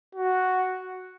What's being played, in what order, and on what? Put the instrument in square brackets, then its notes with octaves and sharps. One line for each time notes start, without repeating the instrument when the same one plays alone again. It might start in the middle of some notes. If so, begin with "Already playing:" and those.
[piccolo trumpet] F#4